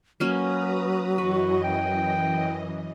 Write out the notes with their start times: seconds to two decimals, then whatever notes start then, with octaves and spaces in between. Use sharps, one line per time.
0.20 F#3 A#3 C#4 F#4 B4 A#5 D#6
1.18 F#2 E3 F#4 B4 D#5
1.64 G5